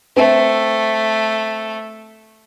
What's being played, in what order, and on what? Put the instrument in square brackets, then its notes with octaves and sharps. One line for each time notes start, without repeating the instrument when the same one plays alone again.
[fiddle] A3 [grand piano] C4 E5